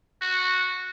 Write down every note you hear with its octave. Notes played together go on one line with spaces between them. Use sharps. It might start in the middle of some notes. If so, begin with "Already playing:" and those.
F#4